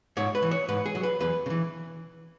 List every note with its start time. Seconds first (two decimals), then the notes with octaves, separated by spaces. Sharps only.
0.17 G#2 C#5
0.35 B4
0.43 E3
0.51 C#5
0.69 G#2 B4
0.86 G#4
0.95 F#3
1.03 B4
1.20 E2 B4
1.46 C#3
1.50 E3